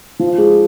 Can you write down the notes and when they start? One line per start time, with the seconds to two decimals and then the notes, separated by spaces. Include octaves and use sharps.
0.20 F3
0.38 G#3